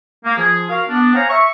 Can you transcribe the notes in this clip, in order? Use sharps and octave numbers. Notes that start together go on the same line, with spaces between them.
A#3
F3 F4 G#4
F#4 A#4 F5
B3 D4
C5 C#5 F5 G#5 A#5
E5 C#6